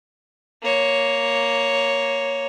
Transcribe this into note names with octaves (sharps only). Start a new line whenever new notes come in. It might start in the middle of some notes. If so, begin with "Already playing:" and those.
A#3 C#5